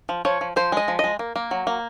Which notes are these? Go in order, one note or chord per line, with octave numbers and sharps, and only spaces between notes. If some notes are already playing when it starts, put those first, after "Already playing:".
F3
F3 C#5
F3
F3 C5
G#3 D#5
F3
G#3 D#5
A#3
A#3
F#3
A#3